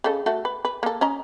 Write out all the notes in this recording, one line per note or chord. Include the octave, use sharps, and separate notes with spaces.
C#3 A4 D#5
A3 F#4 A4
B4
B4
A#3 A4
C#4 D#5 A#5